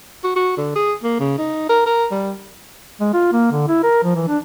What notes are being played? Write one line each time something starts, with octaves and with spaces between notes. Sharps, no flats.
F#4
F#4
D3
G#4
A#3
C#3
D#4
A#4
A#4
G3
G#3
F4
A#3
D3
E4
A#4
F3
E3
D4